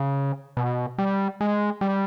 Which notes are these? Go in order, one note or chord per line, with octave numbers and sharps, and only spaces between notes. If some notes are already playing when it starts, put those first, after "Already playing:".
Already playing: C#3
B2
G3
G#3
G3